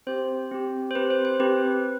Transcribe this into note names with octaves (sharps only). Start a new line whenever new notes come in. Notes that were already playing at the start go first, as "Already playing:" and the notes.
C4 G4 C5
C4 G4
C5
C4 G4 B4
C5
C5
C4 G4 B4